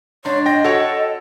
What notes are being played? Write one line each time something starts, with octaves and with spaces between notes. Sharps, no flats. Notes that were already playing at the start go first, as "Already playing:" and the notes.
G#2 D4 C#5 C6
D#5 G5 A#6
F#4 A4 C#5 F#5 G5